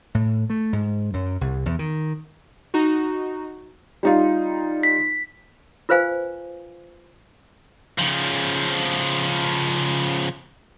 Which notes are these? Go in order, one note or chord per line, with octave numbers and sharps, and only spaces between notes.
A2
A3
G#2
F#2
C2
E2
D#3
D#4 F#4
G3 D#4 F4
B6
F4 B4 C5 F5 G#5
C#3 F3